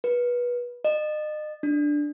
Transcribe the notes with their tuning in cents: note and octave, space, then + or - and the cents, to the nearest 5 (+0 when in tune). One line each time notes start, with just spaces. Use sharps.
B4 -20
D#5 -35
D4 +5